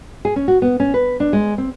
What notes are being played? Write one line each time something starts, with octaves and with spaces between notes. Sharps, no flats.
G#4
C#4
F#4
B3
C#4
B4
D4
G#3
C4